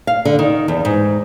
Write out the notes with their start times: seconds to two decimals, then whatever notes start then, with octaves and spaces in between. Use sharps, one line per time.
0.07 F5
0.25 D3
0.39 D#3
0.68 E2
0.85 G#2